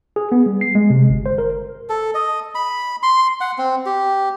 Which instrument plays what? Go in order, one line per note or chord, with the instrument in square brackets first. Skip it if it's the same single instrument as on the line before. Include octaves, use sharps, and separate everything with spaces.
[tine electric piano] G#4
B3
G3
C7
G#3
C3
G1
C5
A#4
[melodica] A4
D#5
B5
C6
F#5
C4
G4